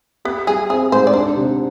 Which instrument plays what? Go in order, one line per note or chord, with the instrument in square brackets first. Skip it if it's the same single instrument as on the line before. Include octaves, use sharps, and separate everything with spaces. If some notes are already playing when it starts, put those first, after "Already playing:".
[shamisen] B3 [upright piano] G4
[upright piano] G3 [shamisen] G#4
[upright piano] C4 [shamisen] G#4
[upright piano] G#2 [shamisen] C5
[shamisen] D5
[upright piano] D4 [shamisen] C5
[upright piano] C3